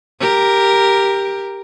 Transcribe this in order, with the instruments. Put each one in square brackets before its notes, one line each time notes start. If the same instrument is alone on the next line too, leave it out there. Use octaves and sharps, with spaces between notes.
[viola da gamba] G4 A#4